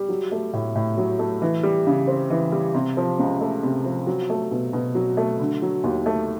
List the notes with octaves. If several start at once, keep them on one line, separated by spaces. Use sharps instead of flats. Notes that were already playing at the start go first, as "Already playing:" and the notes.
Already playing: G3
F#3
A3
A2
A2
F#3
A3
E3
G3
C#3
C4
E3
G3
C3
F3
C#2
A3
C3
F3
F#3
A3
B2
B2
F#3
A3
D3
F#3
D#2
A3